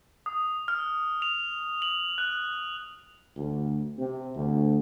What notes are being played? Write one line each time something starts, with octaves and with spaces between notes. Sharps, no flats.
D#6
F6
F7
F#7
F#6
D2
C3
D2